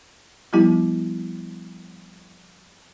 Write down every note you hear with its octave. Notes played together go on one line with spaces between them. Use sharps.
F3 G3 B3 E4 G4